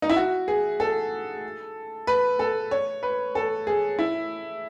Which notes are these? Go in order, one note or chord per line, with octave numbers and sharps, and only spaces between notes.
D#4
E4
F#4
G#4
A4
B4
A4
C#5
B4
A4
G#4
E4